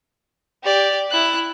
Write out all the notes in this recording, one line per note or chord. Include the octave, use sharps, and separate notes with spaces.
G4 D5
E4 F#6